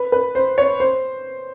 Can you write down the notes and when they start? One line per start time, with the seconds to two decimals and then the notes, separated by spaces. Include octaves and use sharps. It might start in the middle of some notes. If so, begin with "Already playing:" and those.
Already playing: B4
0.12 B4
0.35 C5
0.58 C#5
0.80 C5